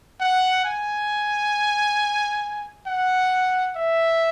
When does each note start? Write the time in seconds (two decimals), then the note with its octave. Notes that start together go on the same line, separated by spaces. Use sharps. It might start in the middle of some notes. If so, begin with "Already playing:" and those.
0.20 F#5
0.65 G#5
2.87 F#5
3.76 E5